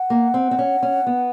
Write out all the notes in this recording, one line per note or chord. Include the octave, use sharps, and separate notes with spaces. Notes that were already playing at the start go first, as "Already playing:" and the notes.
Already playing: F#5
A#3
C4
C4
C#4
C#4
B3